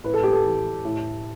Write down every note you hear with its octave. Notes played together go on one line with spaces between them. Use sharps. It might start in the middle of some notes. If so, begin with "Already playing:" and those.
A2 B4
A4
G4
A4
E3
A2